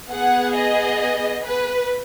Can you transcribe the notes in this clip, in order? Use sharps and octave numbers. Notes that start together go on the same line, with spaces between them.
B3 G#4 F#5
D#5
B4